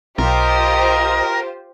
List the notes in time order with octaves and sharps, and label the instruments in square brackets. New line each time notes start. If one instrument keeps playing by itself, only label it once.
[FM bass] B1 [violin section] F4 G4 C5 [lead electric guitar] A#4 [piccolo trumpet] D#5